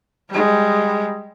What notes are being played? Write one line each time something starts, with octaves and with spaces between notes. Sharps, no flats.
G3 G#3